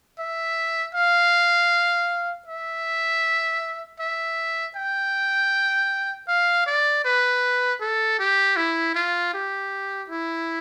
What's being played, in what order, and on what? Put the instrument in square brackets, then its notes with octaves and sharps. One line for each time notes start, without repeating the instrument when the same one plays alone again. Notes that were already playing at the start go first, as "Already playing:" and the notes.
[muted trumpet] E5
F5
E5
E5
G5
F5
D5
B4
A4
G4
E4
F4
G4
E4